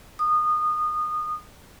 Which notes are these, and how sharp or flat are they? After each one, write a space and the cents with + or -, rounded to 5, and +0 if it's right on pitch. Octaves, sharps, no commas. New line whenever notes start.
D#6 -25